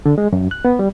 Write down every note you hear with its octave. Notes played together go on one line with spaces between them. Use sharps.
D3
G#3
F#2
F#6
B3
G3